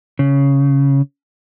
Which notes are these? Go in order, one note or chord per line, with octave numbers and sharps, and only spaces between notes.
C#3